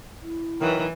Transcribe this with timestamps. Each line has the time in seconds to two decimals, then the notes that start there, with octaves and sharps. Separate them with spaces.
0.22 E4
0.61 D#3 E3 F#3